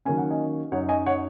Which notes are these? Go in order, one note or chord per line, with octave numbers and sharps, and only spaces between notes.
D#3 F#3 A#3 C#4 G#5
F#5
D#5 G#5
F#2 F#3 D#4 C#5 F#5
D#5 G#5
C#5 F#5